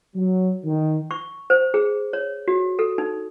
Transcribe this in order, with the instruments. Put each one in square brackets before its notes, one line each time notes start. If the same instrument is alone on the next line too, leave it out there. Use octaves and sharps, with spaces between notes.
[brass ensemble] F#3
D#3
[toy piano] C#6
C5
G#4
C#5
F#4
A4
D#4